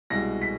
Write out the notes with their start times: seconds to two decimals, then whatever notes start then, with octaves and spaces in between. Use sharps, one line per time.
0.10 C2 B2 G#3 A#6
0.42 B6